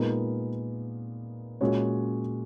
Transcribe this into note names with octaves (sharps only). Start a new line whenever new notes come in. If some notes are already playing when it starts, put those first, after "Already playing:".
Already playing: A#2 G#3 B3 D#4 A#4
A#2 G#3 C#4 F#4 C#5